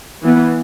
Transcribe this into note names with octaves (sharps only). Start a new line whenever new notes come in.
E3 B3